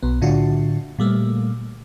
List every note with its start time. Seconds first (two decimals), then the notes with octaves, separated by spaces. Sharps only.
0.03 B1 B3
0.22 A2 D3 D4 F4 F#4
0.99 A#2 G3 A3 A#3